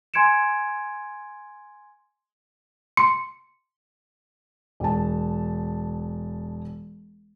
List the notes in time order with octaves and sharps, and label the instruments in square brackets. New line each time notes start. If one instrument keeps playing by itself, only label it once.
[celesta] G#5 C6 G#6 C#7 D7 E7
[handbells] C6 C#7
[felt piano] E1 A5